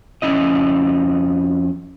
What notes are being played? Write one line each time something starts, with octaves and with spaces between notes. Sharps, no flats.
F2 C#4 E4 D#5